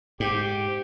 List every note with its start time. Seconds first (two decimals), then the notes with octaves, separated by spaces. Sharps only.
0.20 G#2 G4